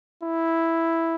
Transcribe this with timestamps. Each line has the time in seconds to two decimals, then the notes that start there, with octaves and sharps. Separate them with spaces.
0.23 E4